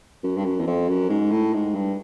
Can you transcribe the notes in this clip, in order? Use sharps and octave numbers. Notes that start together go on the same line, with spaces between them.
F#2
G2
F#2
E2
F2
F#2
G#2
A2
G#2
G2